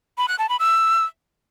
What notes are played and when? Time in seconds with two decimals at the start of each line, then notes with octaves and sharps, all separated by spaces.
0.18 B5
0.28 F#6
0.39 A5
0.49 B5
0.60 E6